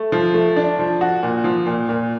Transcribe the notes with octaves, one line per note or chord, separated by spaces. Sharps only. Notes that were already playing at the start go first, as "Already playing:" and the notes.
Already playing: A3
F3
A3
D4
F3
F#4
A#2
F3
A#2
A#2